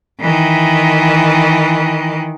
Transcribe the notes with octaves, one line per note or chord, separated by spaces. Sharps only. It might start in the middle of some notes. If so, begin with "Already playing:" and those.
D#3 E3